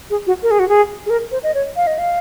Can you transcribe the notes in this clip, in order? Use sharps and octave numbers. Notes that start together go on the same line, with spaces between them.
G#4
F#4
A#4
G#4
F#4
G#4
G#4
A#4
C5
D#5
C#5
F5
D#5
F5